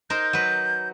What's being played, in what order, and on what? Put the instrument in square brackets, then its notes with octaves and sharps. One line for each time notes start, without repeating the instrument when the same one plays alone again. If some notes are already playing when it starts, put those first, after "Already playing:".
[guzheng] D#4 A#4 C5 [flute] G6
[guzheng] F#3 B4